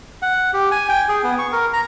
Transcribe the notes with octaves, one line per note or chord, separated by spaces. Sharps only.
F#5
G4
G#5
G5
G#4
B3
C#6
A#4
A#5